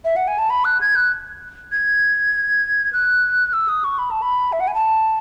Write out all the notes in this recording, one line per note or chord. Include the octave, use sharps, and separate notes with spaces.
E5
F#5
G#5
A5
B5
F#6
G#6
F#6
G#6
F#6
E6
D#6
C#6
B5
A5
B5
E5
F#5
G#5
A5